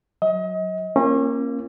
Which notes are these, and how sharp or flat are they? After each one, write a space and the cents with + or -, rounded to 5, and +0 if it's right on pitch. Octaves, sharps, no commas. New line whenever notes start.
F#3 +0 D#5 +35
A#3 +0 C#4 -30 F4 -45